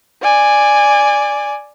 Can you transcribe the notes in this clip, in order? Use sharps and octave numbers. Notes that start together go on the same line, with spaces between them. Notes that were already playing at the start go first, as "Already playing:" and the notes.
D5 G#5